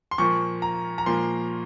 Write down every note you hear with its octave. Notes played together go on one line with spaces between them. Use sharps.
C6
A#2 F3 A#3 C#6
A#5
A#5
A#2 F3 A#3 C6